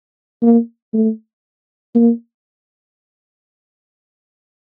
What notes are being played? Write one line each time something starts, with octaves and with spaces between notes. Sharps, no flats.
A#3
A3
A#3